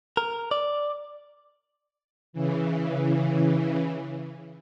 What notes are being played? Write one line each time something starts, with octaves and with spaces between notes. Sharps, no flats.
A#4
D5
C#3 E3